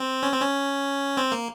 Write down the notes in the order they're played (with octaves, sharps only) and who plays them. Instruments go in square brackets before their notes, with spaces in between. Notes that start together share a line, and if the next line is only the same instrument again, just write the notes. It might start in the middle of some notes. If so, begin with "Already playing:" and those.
Already playing: [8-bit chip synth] C4
C#4
C4
C#4
C4
A#3